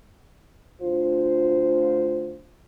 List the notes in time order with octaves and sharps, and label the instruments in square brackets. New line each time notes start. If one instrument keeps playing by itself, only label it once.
[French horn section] D2 F4 C5